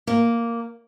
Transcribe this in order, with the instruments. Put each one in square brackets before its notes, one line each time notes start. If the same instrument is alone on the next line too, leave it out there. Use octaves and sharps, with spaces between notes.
[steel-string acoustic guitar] A#3